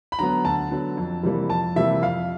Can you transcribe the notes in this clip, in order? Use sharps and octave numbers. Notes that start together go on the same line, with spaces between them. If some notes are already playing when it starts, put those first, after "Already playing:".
B5
D3 F#3 B3 A#5
D2 A5
D3 F#3 B3
F2
C3 E3 G3 A#3
F2 A5
C3 E3 G3 A#3 E5
F2 F5